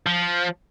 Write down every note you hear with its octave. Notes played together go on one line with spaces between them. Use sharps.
F3